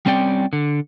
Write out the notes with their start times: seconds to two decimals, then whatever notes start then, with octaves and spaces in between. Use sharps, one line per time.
0.06 G3 C4 C#4 D5 G5
0.53 D3